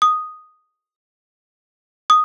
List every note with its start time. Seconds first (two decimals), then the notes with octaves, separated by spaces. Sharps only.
0.02 D#6
2.10 D#6